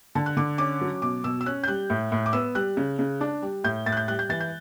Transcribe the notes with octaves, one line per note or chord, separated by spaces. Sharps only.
D3 A5
F#6
D3 D6
C#4 D6
F#3
B2 D6
B2 E6
E6
C#4 F#6
G6
G3 F#6
A2
A2
D6
B3 E6
G3 F#6
C#3
C#3
D4
G3
A2 G6
A2 A6
F#6
G6
G3 F#6
G6
E3 A6
G6